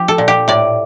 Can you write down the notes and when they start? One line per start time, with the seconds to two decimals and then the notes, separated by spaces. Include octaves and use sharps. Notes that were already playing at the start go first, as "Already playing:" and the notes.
Already playing: F3 G4
0.08 A4
0.18 A#2
0.28 G4
0.48 A2 D5